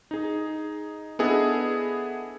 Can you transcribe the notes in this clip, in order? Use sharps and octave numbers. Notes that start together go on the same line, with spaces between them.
D#4 G#4
B3 D4 E4 G#4 A4 D#5